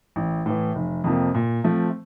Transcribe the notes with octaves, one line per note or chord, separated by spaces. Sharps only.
A1
A2 E3
F1
F2 C3 F3 A#3
A#2
F3 A3 C4